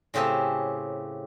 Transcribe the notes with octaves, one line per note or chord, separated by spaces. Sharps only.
A2 C#3 C4 G4 G#5 A5